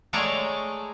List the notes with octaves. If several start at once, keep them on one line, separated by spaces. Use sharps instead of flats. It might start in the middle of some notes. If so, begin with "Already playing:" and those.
G#3 A3 C#5 D5 A5 A#5